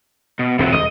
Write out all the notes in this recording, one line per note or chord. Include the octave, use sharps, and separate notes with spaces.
B2
D#1 C3 F3 F#3 C4
D#1 D#5